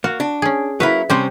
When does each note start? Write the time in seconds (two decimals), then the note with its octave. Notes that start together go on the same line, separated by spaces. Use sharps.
0.04 A#3 F#4
0.20 D4
0.42 C#4 G#4
0.80 F#3 A#3 E4 B4
1.10 C3 G3 C4 C#4 C5